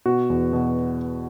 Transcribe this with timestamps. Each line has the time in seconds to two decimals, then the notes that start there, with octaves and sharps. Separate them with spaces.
0.06 B2 F#4
0.30 E2
0.53 B2